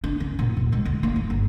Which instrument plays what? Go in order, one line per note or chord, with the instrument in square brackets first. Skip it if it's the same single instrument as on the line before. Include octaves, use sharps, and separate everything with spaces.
[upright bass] D4
C#4
A#2
D#2
G#3
D2
A#3
F2
G1